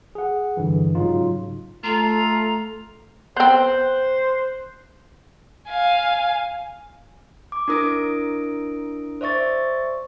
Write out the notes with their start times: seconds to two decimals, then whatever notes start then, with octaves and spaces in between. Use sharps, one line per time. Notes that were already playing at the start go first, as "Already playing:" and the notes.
0.15 G#4 F#5
0.57 G2 D3 E3
0.95 G#2 C#3 F#3 D#4 F4
1.84 A3 F4 A4 A#5
3.36 B3 C4 C5 C6 F#6 G6
5.68 F5 G#5
7.52 D6
7.68 D4 E4 A#4 D#6 A#6 D7
9.21 C5 D5 E5 C#6 A6